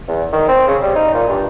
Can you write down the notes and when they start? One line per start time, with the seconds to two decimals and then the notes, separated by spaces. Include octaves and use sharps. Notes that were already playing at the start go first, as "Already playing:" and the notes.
0.08 E2
0.32 D#3
0.48 C4
0.67 C#3
0.82 G3
0.96 D#4
1.14 A#2
1.29 G2